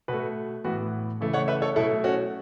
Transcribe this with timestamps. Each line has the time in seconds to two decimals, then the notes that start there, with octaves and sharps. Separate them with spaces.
0.08 B2 A3 F#4 B4
0.64 A2 E3 B3 F#4 B4
1.20 C#3 E3 A3
1.33 C#5 F#5
1.48 B4 E5
1.62 A4 C#5
1.76 B2 F#3 A3 E4 A4
2.04 C#4 F#4